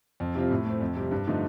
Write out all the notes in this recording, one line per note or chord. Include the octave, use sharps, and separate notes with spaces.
F2
C3 G3 C4 F4
A2
A3 C4
F2
C3 G3
G2
D3 F3 A3 D#4